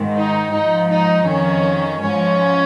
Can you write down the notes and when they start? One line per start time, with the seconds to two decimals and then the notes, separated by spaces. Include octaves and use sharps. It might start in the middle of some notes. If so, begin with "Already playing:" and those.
Already playing: G#2 D#3
0.16 D#4
0.53 G#2 F3 D#4
0.89 D#4
1.27 F2 D#3 C#4
2.01 G#2 F3 C#4